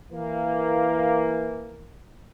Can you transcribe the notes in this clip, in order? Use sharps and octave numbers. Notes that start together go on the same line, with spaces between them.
E3 A#3